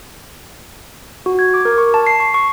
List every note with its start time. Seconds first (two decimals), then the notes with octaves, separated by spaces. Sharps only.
1.26 F#4
1.39 G#6
1.54 D6
1.65 A#4
1.78 C#6
1.94 A5
2.07 C7
2.20 C#6
2.34 C#6